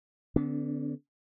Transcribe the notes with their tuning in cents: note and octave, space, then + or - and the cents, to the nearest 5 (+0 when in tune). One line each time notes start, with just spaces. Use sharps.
D3 +0 B3 +30 D4 -40